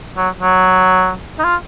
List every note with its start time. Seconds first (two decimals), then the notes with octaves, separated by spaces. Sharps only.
0.17 F#3
0.40 F#3
1.39 D#4
1.44 F4